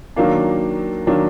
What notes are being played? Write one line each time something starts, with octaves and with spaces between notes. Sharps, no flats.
D#3 F#3 A#3 D4
D#3 F#3 A#3 D4